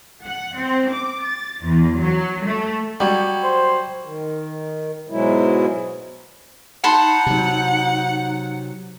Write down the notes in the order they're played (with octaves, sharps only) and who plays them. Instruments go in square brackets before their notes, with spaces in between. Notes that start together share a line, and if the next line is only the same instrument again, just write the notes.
[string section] F#5
C4
D6
A6
E2
F#3
A3
[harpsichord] F#3 [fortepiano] G3 [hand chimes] G5 C#6 G#6
[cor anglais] C5
[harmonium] D#3
G#2 B2 F#3 G#3 E4
[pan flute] D#4 [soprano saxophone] F#5 [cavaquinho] A5 B5 C6
[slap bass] C3 F#3